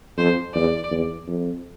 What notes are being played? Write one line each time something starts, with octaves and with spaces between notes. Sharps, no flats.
F2 C5
E2 D5
E2
F2